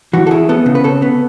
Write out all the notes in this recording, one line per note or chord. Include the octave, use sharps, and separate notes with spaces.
E3 F#4
A4
E4 G#4
B3 A4
C#3
B4
C#3 A4
B3